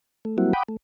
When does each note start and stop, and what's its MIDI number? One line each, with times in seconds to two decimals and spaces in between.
0.25 0.37 57
0.38 0.53 54
0.38 0.53 55
0.38 0.53 58
0.38 0.53 60
0.38 0.53 64
0.38 0.53 66
0.53 0.63 78
0.53 0.63 79
0.53 0.63 83
0.53 0.63 86
0.53 0.63 87
0.68 0.77 57